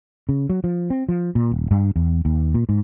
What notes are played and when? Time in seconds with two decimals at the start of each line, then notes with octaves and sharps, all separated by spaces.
0.29 C#3
0.50 F#3
0.64 F3
0.90 C4
1.09 F3
1.35 A#2
1.51 D#1
1.71 G2
1.96 E2
2.25 D#2
2.54 A#2
2.69 G#2